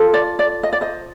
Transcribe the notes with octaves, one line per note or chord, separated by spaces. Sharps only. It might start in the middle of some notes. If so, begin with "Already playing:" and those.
Already playing: F4 A4
D5
D5
D#5
D5
C5 D#5